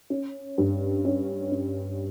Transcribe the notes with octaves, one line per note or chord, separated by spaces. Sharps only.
C#4
G2
C#4
C#4